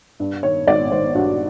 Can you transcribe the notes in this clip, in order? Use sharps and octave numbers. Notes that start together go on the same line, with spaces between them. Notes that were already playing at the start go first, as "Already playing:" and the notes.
G2
D#3 C#5
G#1 D5
G#1 C5
G2 F#4